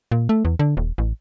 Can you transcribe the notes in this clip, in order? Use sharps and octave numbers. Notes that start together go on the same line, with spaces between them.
A#2
A3
E2
D3
D#1
A1